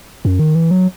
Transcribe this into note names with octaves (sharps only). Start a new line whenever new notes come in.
F#2
D#3
E3
F#3